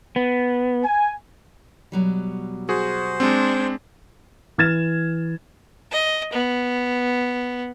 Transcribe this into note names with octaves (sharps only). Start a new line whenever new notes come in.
B3
G#5
B2 F#3 G3
F#4 G#4 C5
G#3 C4 D4
E3 F6 G#6 A6 E7
D#5
B3